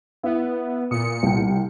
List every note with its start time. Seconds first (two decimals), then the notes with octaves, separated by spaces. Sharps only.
0.23 B3 E4
0.91 A#2 D#6 C#7
1.23 C2 G5